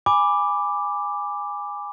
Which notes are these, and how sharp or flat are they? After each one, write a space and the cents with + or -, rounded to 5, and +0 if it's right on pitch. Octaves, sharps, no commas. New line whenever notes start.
G#5 -15 B5 +0 D6 +0